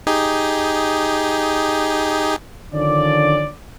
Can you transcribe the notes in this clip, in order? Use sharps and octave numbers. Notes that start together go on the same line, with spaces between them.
D#4 G4 G#4
D3 D#3 F3 C#4 D5